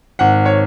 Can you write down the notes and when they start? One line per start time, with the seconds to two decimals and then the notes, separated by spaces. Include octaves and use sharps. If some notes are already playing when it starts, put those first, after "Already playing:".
0.19 G#1 F#5
0.46 C#5